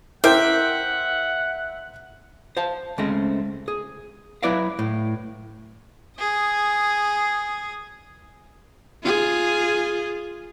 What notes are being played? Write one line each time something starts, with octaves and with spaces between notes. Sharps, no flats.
E4 A#4 C5 E5 F#5 G5
C5 F5 A5
C#2 G#3 A3 C4 C#4 D#5
G#4
F#3 E4 B4 D5 E5 F5
A2
G#4 D#6
F4 G#4